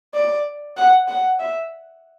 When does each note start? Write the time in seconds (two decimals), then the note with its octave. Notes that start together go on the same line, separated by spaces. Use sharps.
0.14 D5
0.77 F#5
1.08 F#5
1.40 E5